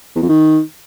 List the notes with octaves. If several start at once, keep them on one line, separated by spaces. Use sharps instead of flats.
E2
F2
D#3